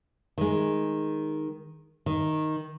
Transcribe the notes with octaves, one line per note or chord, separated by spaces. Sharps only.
D#3 G#3
D#3